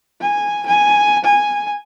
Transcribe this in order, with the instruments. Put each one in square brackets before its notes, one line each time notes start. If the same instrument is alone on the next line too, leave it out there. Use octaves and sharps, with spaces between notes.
[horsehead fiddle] G#5
G#5
G#5